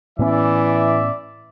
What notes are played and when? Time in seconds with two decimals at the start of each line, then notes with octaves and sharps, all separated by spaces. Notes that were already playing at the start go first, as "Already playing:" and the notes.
0.19 A2 E3 B3 C#4 D5 E5